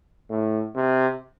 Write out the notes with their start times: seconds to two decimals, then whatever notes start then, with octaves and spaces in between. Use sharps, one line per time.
0.29 A2
0.75 C3